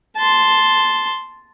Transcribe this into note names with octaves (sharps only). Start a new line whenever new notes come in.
A5 C6